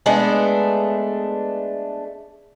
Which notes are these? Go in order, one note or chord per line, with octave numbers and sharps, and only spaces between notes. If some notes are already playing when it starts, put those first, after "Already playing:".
G#3 A3 B3 D4